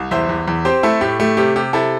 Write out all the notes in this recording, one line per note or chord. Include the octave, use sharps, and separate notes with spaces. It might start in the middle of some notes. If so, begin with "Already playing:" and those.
Already playing: C2
E2 C5 E5
E2
E2
C4 G4 C5
A3 E4 A4
A2 G4
A3 G4
C3 G4
C3 G4
C3 E4 A4